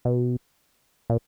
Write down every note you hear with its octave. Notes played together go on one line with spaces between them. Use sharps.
B2
A#2